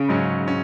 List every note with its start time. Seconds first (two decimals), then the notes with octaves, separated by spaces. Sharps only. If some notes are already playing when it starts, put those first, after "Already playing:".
Already playing: C#3
0.09 G#2 F#3 C#4
0.48 C#4